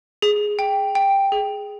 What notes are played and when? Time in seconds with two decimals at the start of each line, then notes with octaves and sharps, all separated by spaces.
0.22 G#4
0.59 G5
0.95 G5
1.32 G#4